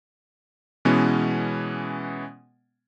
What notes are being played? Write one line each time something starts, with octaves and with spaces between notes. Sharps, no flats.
B2 E3 G#3 B3 C#4